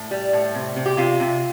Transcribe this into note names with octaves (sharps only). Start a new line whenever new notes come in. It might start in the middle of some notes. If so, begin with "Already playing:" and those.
Already playing: A2
G3
A2
C3
C3
G4
C3 F4
C3